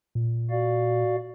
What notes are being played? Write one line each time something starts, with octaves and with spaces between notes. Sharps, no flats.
A#2
F#4 D5 F5